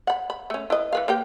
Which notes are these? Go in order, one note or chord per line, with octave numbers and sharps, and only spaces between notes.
F#5 B5
B5
A3 C#4
E4 B4 D#5
E3 B4 F5
A#3 G4 G5